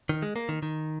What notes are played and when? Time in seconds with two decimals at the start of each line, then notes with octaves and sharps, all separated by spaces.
0.09 D#3
0.22 G#3
0.36 A#3
0.49 D#3
0.63 D#3